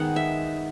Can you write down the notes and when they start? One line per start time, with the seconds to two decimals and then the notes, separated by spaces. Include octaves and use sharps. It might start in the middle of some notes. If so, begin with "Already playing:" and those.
Already playing: D#3 G#3 B3 F#5
0.16 E5